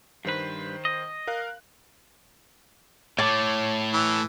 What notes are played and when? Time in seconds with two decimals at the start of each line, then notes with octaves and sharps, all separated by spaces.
0.25 G2 D#3 B4 C5
0.85 D#5
1.27 A#4 F5 F#6
3.18 A2 A3 C#5 A5 D6
3.93 E3